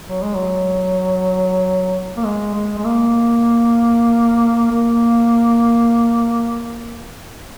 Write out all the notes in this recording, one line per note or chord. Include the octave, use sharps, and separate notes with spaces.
F#3
G#3
F#3
A#3
G#3
G#3
G#3
A#3
A#3